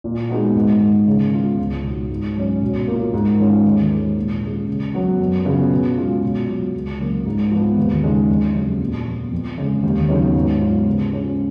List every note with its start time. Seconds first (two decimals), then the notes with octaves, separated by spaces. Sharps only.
0.04 A#2
0.29 G#3 B3 D#4 F#4
0.55 G#2
0.80 D#3 G#3
1.07 C#3
1.32 G#3 B3 F4
1.58 C#2
1.84 B2 G#3 D#4 F#4
2.10 G#2
2.36 F#3 C#4
2.62 B2
2.88 A#3 F4
3.13 G#2
3.39 D#3 G#3 C#4 F4
3.65 D#2
3.90 D#3 G#3
4.16 A#2
4.42 G#3 C#4 F4
4.68 C#3
4.94 F#3 B3 F#4
5.19 F#2
5.45 C#3 F3 B3
5.71 B2
5.96 G#3 C#4 F4
6.22 B2
6.49 F#3 B3 F4
6.74 C#2
6.99 C#3 F#3 A#3
7.25 G#2
7.51 F3 B3
7.77 D#2
8.04 C#3 G#3 D#4
8.29 F2
8.54 C#3 F#3 B3
8.80 A#2
9.06 F3 B3
9.32 F2
9.58 C#3 G#3
9.83 D#2
10.09 C#3 F#3 B3 D#4
10.35 G#2
10.60 F#3 B3 F4
10.87 C#3
11.12 G#3 C#4 F4